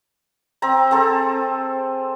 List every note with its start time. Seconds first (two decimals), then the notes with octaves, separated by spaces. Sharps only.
0.62 C4 A#5
0.91 C4 G#4 A4